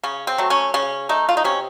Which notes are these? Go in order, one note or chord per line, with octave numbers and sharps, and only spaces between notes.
C#3 C#4
C4
F#3 A3
C#4
C#3 C#4
A3 D#4
F4
D#4
C3 C#4